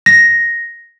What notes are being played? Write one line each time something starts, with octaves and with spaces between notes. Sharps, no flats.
A#6